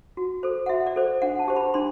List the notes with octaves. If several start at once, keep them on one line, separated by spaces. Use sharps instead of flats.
F#4
A4 C5
F#5
F#4 E5
D5
A4 C5
D4 F#5
A5
G4 C5
B5
D4 C6